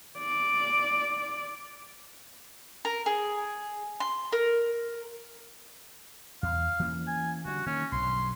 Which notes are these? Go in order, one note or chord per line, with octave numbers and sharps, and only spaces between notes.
D5
A#4
G#4
C6
A#4
E2 F5
E3 A#3 C#4
G#5
D3 G3 F#4
D#3 A#3 C#4
B1 G2 C6